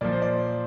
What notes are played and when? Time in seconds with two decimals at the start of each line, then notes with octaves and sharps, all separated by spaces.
0.01 A#2 F3 D5
0.12 C5
0.22 D5